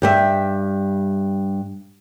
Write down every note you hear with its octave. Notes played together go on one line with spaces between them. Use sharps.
G2 G3 E5